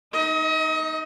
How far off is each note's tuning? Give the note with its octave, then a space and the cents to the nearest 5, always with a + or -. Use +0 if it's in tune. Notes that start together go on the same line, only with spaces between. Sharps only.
D#4 +0 D#5 +35